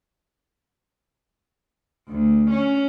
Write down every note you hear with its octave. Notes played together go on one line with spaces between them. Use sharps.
D2
C#4